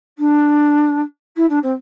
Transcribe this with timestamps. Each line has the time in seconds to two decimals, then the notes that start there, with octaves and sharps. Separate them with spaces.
0.18 D4
1.36 E4
1.49 D4
1.62 C4